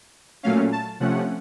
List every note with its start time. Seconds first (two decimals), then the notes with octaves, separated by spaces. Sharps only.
0.43 A#2 F#3 A3 C#4 F5
0.72 A5
1.00 C3 F3 A3 C#4 F#5